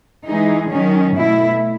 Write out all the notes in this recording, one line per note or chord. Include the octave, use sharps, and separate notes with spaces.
E3 G#3 D#4 G#4
D#3 F#3 C#4
B2 A3 E4